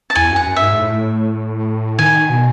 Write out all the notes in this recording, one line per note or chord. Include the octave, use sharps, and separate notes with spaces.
A5
E2 G#5
F#2 F#5
F#2
E5
G#2
G#2
A2
D#3 G#5
B2